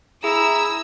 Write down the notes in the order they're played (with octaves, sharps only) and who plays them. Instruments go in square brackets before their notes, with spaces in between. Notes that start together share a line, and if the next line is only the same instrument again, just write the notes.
[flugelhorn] E4 [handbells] G#4 [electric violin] A#5 [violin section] E6